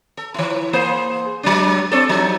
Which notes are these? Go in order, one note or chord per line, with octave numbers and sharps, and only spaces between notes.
A4
E3 E4
A#3 G#4 C5
F#3 G#3 D4
C4 D4 A4
F3 F#3 D#4